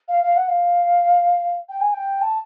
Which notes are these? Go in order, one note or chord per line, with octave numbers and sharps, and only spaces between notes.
F5
F5
F#5
F5
G5
G#5
G5
A5